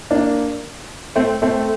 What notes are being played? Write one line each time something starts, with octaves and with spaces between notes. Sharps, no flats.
A#3 D4
A3 C4
A3 C4